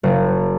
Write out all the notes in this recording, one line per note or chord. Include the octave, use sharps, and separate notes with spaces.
F#1